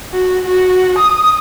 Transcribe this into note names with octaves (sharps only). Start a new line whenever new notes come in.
F#4
F#4
D#6